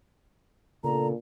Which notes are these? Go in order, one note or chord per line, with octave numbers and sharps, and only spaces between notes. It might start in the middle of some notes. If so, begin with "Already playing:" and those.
A#2 C#3 B3 D4 A4 A#5